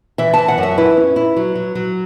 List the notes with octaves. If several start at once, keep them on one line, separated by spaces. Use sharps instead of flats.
E3 E5
E3 A5
F#5
F#2
E5
E4 B4
C#4
E4
F#3
F#3
F#3